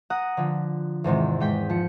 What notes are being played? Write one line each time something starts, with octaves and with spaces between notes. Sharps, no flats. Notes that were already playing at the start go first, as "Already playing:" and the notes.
F#5 A#5 D#6 F#6
D3 F3
E2 G#2 C3 D#3
G#2 G5 B6
F3 C#7